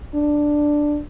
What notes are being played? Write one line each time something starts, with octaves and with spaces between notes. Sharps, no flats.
D4